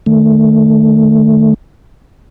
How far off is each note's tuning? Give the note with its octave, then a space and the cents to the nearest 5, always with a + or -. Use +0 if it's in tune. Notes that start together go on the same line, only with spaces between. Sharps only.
D#3 -15 A3 +0